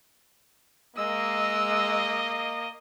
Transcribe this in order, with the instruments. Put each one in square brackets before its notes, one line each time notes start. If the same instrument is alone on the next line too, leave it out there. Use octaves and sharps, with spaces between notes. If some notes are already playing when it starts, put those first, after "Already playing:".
[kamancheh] G#3 E6 [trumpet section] A#3 D#5